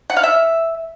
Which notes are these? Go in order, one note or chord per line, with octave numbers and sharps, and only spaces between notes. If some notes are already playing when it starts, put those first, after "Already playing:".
F#5
F5
E5